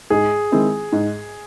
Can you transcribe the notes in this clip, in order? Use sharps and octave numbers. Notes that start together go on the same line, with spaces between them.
G#2 G#4
D#3 G#3 C4 E4
G#2